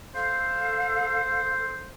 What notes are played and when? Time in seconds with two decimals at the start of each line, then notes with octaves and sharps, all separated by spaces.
0.15 A4 C5 F5